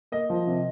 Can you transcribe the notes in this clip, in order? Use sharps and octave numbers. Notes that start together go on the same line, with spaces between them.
A#3 D#5
F3
C3